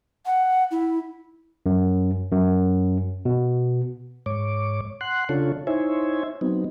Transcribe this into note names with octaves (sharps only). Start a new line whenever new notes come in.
F#5
E4
F#2
F#2
B2
G#2 C#5 D6
F#5 C6 F#6
C#3 D4 F4 A4 C#5
D#4 E4 C5 C#5 E5 G#5
F#3 B3 C4 D#4